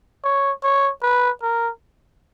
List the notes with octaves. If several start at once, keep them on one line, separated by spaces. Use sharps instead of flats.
C#5
C#5
B4
A#4